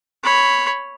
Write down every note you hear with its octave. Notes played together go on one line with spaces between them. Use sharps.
C#5 B5